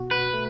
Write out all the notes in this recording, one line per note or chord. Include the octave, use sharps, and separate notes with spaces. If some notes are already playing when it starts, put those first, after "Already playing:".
Already playing: B2 F#4
F#4 B4
A3